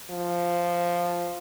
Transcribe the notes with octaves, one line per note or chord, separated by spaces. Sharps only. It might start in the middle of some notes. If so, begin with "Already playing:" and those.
F3